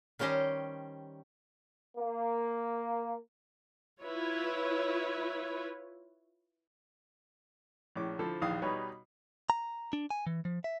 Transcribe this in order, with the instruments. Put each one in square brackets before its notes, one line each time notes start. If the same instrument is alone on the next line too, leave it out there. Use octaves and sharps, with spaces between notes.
[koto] D#3 G3 C#4 G4 C5 D#5
[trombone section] A#3
[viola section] E4 F4 B4 C#5
[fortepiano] A#1 A2 C#4 D6
D3 F3 E4 A4 C5
A#1 D#2 E3 F5 D#6
B2 G3 D#4 B4 C#5
[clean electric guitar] A#5
D4
G#5
E3
F3
E5